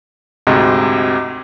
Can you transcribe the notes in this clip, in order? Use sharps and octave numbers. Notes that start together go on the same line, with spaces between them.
D2 G#2 C3 F#4 D#5